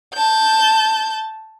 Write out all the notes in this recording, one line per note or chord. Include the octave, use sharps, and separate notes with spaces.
A5 G6